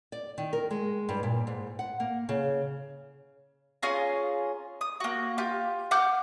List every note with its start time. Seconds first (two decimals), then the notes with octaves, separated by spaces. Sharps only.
0.12 D5
0.38 D#3
0.53 A#4
0.71 G#3
1.09 G2
1.23 A#2
1.47 G#2
1.79 F#5
2.00 A#3
2.29 C#3
3.82 C#4 F4 G#4 A#5
4.81 D#6
5.00 A#3 F#4
5.38 F4 G4
5.91 F#5 D6 F6 G6